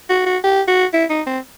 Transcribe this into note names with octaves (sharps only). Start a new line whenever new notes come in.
F#4
F#4
G4
F#4
E4
D#4
C4